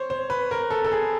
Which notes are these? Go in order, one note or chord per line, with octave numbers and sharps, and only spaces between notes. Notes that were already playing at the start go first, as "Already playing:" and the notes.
Already playing: C5 C#5
C5
B4
A#4
A4
A4
G#4